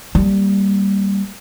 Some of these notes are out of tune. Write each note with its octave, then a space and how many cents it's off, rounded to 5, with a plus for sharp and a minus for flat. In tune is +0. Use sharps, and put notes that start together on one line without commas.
G3 +0 A#3 +0